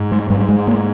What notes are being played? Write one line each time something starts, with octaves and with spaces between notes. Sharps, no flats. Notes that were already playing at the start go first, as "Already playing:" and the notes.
Already playing: G#2
G#3
G#2 G3
G#3
A#3